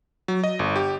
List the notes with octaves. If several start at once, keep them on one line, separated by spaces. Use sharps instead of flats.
F#3
D#5
G1
G4